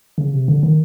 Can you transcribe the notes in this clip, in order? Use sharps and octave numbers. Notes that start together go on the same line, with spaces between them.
C#3
C3
D3
D#3